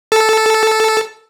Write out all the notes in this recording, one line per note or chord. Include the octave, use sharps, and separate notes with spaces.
A4